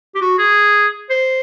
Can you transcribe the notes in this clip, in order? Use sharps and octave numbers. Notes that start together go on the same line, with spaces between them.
G4
F#4
G#4
C5